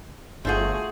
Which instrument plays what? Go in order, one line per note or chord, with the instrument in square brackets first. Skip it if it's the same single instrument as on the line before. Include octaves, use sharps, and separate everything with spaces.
[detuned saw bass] G1 [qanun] A3 F4 [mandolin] F#4 C5 [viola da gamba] G#4